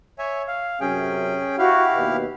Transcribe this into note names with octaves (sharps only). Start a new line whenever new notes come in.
C#5 E5 G#5
F5
F#2 C3 C#4 G#4 G5
E4 F#4 G4 F5
D#2 B2